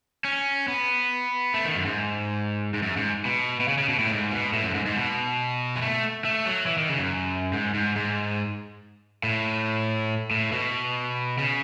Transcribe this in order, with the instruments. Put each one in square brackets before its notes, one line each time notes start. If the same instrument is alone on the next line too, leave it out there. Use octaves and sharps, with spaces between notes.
[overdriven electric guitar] C#4
B3
A3
D#3
F#2
G#2
G#2
F#2
G#2
B2
B2
C#3
C#3
B2
A2
G#2
B2
A2
F#2
G#2
G#2
B2
G#3
A3
A3
F#3
E3
D#3
C#3
F#2
G#2
G#2
G#2
A2
A2
B2
C#3